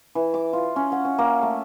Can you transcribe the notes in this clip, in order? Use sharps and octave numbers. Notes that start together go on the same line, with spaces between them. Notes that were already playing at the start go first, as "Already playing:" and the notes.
E3
D6
F4
C#4
F#5
C#4
A#3
A3